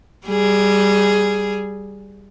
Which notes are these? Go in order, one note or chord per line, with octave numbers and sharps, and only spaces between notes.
G3 G#4